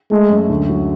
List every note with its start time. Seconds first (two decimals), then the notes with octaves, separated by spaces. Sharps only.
0.11 G#3 A3
0.30 F#2
0.50 D2
0.69 F#3